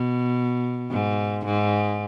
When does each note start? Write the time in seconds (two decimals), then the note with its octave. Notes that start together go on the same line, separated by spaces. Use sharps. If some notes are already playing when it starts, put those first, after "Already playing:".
Already playing: B2
0.91 G#2
1.45 G#2